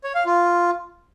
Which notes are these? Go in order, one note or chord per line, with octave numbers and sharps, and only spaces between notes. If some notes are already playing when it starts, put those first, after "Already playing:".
C#5
F5
F4